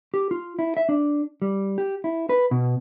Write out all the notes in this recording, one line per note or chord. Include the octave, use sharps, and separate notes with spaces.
G4
F4
E4
E5
D4
G3
G4
E4
B4
B2